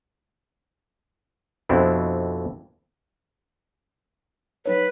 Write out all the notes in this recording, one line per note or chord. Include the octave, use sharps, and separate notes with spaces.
F2 B2 C4 D4 E4
F#3 D#4 B4 C#5